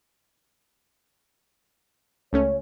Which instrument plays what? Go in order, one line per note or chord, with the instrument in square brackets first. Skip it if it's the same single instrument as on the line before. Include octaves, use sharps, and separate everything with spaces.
[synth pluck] C#2 A3 C#4 [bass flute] C#5